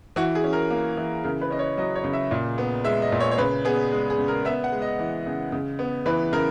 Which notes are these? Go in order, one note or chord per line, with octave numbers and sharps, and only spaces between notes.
E3 F#4
G#4
C#4
A#4
A#3
E3
C#3 A#4
B4
C#4 D#5
C#5
F#3 D#5
C#5
C#3
E5
A#2
B3
G#3 E5
D#5
A#2
C#5
C#5
C#3 B4
B3 G#4
G#3
G#4
C#3
A#4
B3 E5
F#5
G#3
D#5
E3
C#3
C#3
B3
E3 B4
C#3 A#4